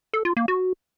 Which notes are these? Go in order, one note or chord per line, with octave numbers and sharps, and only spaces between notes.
A4
F4
A#3
F#4